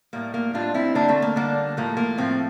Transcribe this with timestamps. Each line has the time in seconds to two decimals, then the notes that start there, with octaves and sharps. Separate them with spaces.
0.13 A2 G3 A#3
0.34 A#3
0.53 A2 G3 D4 F4
0.74 C4 E4
0.95 D3 G3 A#3 D4
1.08 A3 C4
1.22 A#3
1.36 D3 G3 A#3 D4
1.77 A2 F3 A3 A#3
1.97 A#3
2.18 A2 F3 A3 C4